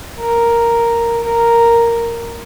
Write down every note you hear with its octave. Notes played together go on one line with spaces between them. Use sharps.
A#4
A#4